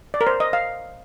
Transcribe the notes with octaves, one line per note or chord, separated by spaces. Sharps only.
D5
A#4
C5
D#5
F5